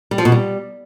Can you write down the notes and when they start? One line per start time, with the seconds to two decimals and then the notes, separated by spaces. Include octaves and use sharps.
0.11 G3
0.18 F3
0.25 B2
0.32 G3